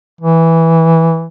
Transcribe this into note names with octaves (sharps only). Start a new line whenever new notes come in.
E3